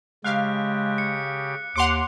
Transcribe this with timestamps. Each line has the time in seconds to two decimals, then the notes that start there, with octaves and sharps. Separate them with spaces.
0.25 C#3 G#3 G4 F5 F#6
0.98 C#7
1.76 D#2 F#5 C6 D6 C#7 F7